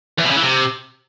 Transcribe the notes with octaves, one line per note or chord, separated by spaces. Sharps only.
E2
B2
C#3
E3
C3